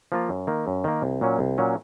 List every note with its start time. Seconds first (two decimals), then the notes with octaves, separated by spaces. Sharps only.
0.12 F3 A#3 F4
0.29 F#2
0.47 D#3 A#3
0.67 F#2
0.84 D#3 A#3
1.02 C2
1.21 A#2 F#3 C#4
1.39 C2
1.58 A#2 F#3 C#4